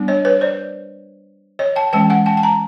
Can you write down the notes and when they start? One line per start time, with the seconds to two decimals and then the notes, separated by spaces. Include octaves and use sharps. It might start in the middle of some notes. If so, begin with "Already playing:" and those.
Already playing: G3 B3 D4
0.08 C#5 D#5
0.25 B4 C#5
0.41 C5 D5
1.59 C#5 D#5
1.76 G5 A5
1.93 E3 G#3 C#4 G5 A5
2.10 F#5 G#5
2.26 G5 A5
2.37 A5
2.43 G#5 A#5